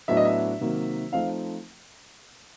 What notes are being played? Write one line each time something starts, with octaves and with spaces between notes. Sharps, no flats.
A2 F#3 B3 D4 E5
D#5
E5
C3 D#3 F#3 A#3
F3 A3 C4 D#4 F5